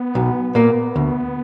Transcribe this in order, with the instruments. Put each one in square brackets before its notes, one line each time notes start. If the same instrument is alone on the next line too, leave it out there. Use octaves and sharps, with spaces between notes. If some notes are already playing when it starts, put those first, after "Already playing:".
Already playing: [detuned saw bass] B3
[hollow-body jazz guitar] B1
A#2 A#3
D2